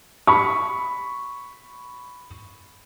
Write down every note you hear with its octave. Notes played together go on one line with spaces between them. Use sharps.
B5 C#6